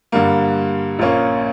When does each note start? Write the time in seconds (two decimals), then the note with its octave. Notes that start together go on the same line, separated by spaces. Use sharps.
0.12 G2 D3 G3 A#3
0.99 A#1 A#2 A#3 C#4